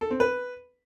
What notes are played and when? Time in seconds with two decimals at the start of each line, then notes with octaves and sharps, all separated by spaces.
0.01 A4
0.11 C4
0.20 B4